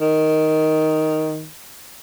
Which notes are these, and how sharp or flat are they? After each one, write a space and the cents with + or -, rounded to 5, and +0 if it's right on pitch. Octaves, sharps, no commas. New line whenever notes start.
D#3 +5